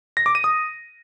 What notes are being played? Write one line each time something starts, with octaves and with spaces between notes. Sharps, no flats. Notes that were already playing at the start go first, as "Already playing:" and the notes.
A#6
D6
D#7
D#6